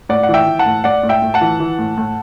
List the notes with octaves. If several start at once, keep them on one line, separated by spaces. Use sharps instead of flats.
A2 D5 F#5
F#5
E3
E5 G5
E3
F#5 A5
A2
A2 D5 F#5
A2
E5 G5
A2
F#5 A5
E3
E3
A2
A2